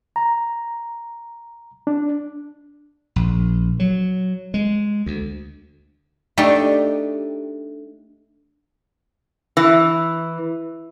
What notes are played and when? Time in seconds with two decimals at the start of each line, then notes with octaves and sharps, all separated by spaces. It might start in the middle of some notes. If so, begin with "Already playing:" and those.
0.16 A#5
1.87 D4
3.16 A#1
3.80 F#3
4.54 G#3
5.06 D2
6.38 A3 D4 D#4 G4 D5
9.57 E3